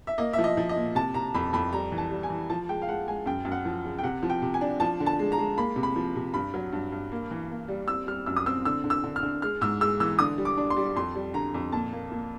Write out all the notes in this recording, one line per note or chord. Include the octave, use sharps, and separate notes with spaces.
E5
A#3 D#5
F3 E5
D#5
F3
D#5
A#2
C3 A5
C3 A#5
F2 B5
F2 B5
G3 A#5
E3
A5
G3
G#5
E3
F3 A5
G#3 G5
F5
G#3 F#5
G#3 G#5
F#2 G5
F#2
F#5
F3
C#3
G5
C3 F#5
F3
G5
C3
G#5
D4
F3 A5
D3
A5
G#3
A#5
G#3
A#3 B5
C3
B5
F3
C3
G2 B5
F#3
G2
G2
A#3
E3
A#3
G3
C4 E6
G3 F6
F#2 E6
D#6
C4 E6
D3 E6
D3
E6
D3
F6
D3
G#3 F6
G#2 E6
G#3 E6
E3 E6
D3 D#6
G3
D6
D4
C6
G3
F2 C6
G3
D3 A#5
F2
A#2 A5
A#3
A#2